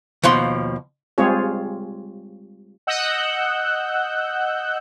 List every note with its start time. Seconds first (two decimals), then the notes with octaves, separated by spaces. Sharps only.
0.23 D#2 B2 F3 C6
1.18 G3 G#3 C4 F4 G#4 C#5
2.87 D#5 F#5 E6 F#6 G6